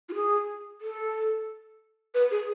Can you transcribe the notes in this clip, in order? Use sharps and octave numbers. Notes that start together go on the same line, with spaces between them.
F4
G#4
A4
B4
G#4